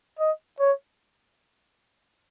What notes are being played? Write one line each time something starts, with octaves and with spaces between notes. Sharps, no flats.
D#5
C#5